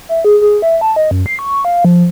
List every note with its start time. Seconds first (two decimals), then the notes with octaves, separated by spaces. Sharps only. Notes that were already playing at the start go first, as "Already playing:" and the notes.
0.09 E5
0.25 G#4
0.41 G#4
0.62 E5
0.81 A5
0.96 D#5
1.11 F#2
1.26 C7
1.39 C#6
1.65 F5
1.85 F3